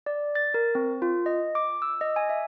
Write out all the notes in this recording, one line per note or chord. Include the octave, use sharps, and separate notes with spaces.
D5
A6
A#4
C4
F4
D#5
D6
E6
D#5
G#5
E5